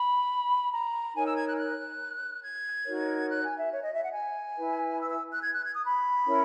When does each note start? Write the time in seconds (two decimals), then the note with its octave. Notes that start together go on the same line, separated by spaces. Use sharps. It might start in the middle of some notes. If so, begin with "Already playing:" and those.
Already playing: B5
0.73 A#5
1.15 D#4 A#4 C#5 G#5
1.26 E6
1.36 G#6
1.48 F#6
1.58 F#6
2.43 G#6
2.86 D#4 F#4 A#4 C#5
3.29 F#6
3.42 G#5
3.57 E5
3.71 C#5
3.82 D#5
3.93 E5
4.03 F#5
4.14 G#5
4.57 E4 B4
4.99 E6
5.10 E6
5.31 F#6
5.42 G#6
5.52 F#6
5.64 G#6
5.74 D#6
5.85 B5
6.27 C#4 E4 A#4 C#5